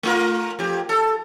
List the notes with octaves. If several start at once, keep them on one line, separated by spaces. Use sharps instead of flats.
A3 F4 A#4
F2 G4
A4